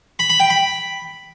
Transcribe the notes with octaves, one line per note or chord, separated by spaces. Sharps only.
B5
B5
G5
B5